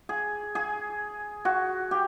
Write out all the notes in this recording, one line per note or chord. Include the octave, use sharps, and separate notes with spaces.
G#4
G#4
F#4
G4